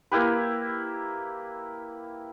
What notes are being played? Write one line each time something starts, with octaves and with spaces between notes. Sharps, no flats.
A#3 E4 G4 B4